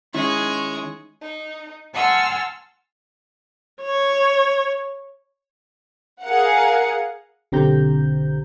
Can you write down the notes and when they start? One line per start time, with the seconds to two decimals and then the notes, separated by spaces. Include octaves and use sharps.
0.14 D#3 G#3 C#4 E4 C#6
1.19 D#4
1.94 F#5 G#5 A5 C6 E6 F6
3.82 C#5
6.23 G#4 A#4 F5 F#5
7.52 B1 D3 C4 G4 A#5 G6